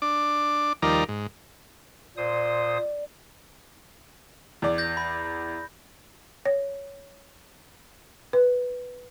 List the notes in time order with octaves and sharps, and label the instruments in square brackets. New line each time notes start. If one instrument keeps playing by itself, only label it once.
[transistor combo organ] D4 D6
D#2 F3 G3 D#4 A#4 D5
G#2
[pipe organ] A#2 C5 D#6 [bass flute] D5
[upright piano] E2 D5
[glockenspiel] G6 A#6
B5
[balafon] C#5
B4